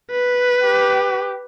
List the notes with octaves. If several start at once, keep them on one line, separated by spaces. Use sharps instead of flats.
B4
G4